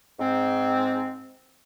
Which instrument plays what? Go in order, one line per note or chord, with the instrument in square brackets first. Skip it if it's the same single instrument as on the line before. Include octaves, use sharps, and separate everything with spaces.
[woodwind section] G#2 C4